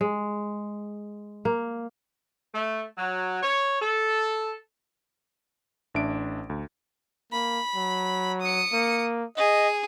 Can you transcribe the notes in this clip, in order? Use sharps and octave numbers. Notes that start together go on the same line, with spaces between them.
G#3
A#3
A3
F#3
C#5
A4
A1 D4 E5 D7
D2
A#3 B5
F#3
D#6 C#7
A#3
G#4 D#5